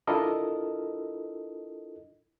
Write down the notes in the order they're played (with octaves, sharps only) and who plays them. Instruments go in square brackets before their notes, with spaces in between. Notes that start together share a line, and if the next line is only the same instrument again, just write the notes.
[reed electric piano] D4 E4 F4 A4 A#4 D#5